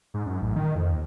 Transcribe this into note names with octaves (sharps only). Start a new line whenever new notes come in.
G#2
F#2
A1
D#3
F2
D#2